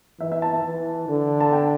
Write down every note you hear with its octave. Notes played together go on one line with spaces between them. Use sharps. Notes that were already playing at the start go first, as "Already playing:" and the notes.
E3 E5
E5
A5
A5
E3
D3
A5
G5